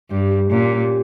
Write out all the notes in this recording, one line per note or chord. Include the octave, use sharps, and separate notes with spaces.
G2 G4
G4
A#2 C#4
G4